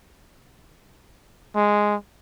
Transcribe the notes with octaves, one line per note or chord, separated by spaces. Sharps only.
G#3